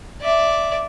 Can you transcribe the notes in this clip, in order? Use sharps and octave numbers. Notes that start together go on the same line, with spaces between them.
D5 E5